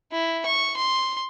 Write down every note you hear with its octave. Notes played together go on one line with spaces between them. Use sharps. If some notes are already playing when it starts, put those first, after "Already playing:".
E4
C#6
C6